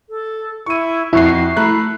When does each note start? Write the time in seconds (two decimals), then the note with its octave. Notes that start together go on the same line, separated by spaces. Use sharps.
0.10 A4
0.66 E4 C#6 D#7
1.13 F2 E4 F#4 C#6 C7
1.56 A3 A#5 B5 F#6